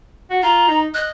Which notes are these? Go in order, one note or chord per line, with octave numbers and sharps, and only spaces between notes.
F#4
F4 A#5
D#4
D#5 F#6